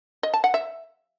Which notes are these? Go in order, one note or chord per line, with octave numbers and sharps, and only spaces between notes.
D#5
A5
F#5
E5